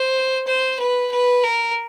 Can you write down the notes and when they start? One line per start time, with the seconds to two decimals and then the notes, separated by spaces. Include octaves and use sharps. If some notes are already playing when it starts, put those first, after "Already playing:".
Already playing: C5
0.47 C5
0.79 B4
1.11 B4
1.43 A#4